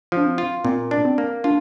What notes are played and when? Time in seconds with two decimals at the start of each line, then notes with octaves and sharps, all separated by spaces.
0.12 F3 D4
0.26 C4
0.38 F4
0.64 A#2 C4
0.91 D4
1.05 C4
1.18 A#3
1.44 D4 F4